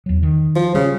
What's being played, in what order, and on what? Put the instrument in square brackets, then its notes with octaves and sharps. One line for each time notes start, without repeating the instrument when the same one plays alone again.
[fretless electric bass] E2 F#3
D#3
[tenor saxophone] F3
[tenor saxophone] C#3 [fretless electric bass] G3